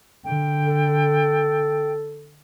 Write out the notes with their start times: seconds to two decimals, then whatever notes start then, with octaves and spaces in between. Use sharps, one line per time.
0.24 D3 G5
0.67 A4